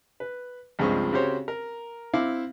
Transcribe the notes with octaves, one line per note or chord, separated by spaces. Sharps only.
B4
C#2 G2 F3 G#3 C4 C#6
C#3 C4 F#4 G4 C5 C#5
A#4
C4 E4 F5 D6